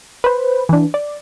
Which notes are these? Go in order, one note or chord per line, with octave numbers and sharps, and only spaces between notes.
B4 C5
E3 D4
D5